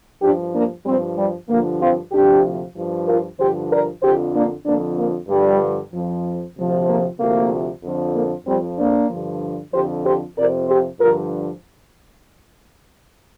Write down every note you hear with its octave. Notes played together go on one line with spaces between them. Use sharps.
G2 F3 D4 G4
A#3 D4
G2 F3 G3 C4
G3
G2 D3 F3 A#3
C4 F4
D2 C3 F3 D4 G4
G2 F3
F4 A#4
G2 D3 F3 G4 C5
A#4 D5
F2 D3 F3 G4 C5
A#3 D4
F2 D3 F3 A#3 D4
A#3
G2 D3 F3 G3
F2 F3
D2 C3 F3
A#3
D2 C3 F3 A#3
F2 D3 F3
A#3
F2 F3 G3 C4
A#3 D4
G2 D3 F3
F2 D3 F3 G4 C5
G4 C5
F2 C3 F3 A#4 D5
G4 C5
G2 D3 F3 F4 A#4